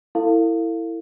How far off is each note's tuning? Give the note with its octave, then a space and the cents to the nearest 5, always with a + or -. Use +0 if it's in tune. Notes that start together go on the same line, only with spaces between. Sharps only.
E4 +0 A4 +40 F5 -5